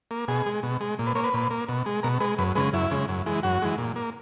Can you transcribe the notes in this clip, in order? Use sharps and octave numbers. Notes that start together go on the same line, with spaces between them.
A#3
B2 G#4
G#3
B2
G#3
A#2
B4
A#3 C#5
B4
A#2
A#3
B2
G#3
B2 A#4
G#3 B4
F#2 B4
C#3 G#3 B4
F#2 E4
C#3 G#3
F#2
E3 G#3
F#2 F#4
E3 G#3
A#2
A#3